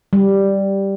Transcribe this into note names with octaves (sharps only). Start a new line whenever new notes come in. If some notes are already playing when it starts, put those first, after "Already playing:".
G3